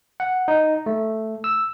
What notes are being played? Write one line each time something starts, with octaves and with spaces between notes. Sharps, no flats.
F#5
D#4
A3
E6